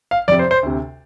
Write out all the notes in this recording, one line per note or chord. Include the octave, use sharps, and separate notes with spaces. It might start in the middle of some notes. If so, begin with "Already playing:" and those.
F5
F2 C3 D5
C5
C5
D2 C3